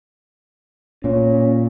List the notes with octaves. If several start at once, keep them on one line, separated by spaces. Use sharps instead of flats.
A#2 C#4